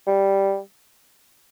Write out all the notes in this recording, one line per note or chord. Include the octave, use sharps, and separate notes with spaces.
G3